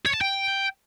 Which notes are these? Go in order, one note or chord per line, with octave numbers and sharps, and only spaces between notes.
C#5
A5
G5